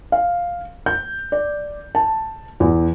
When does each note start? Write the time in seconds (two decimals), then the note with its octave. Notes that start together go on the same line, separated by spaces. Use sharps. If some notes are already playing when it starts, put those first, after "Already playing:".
0.12 F5
0.86 G6
1.32 D5
1.95 A5
2.60 E2